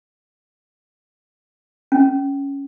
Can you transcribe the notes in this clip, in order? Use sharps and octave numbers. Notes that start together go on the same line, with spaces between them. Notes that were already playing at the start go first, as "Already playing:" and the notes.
C#4